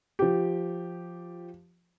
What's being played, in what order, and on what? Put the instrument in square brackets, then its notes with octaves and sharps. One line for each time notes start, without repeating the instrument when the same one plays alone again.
[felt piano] F3 G4